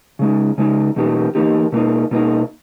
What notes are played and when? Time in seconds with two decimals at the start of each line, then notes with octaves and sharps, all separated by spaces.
0.19 C#3 G#3 D#4
0.58 C#3 G#3 D#4
0.96 E2 B2 A#3 D#4 G4
1.35 E2 B2 A#3 D#4 G4
1.72 B2 A#3 D#4
2.11 B2 A#3 D#4